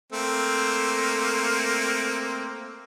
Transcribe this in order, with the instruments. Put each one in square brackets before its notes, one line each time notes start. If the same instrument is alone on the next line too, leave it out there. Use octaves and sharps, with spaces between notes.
[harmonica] A3 A#3 C4